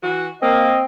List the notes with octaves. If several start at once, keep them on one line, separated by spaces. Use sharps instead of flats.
E3 F#4
A#3 C4 D#5